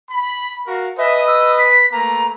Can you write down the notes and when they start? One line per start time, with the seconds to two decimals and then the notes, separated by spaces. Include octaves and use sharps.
0.11 B5
0.66 F#4 A#4 F5
0.99 B4 D#5 E5 G#5 D#6
1.27 E6
1.58 B6
1.92 A3 A#3 B4 A#5